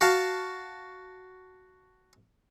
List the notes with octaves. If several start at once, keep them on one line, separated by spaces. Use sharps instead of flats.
F#4 F5 A5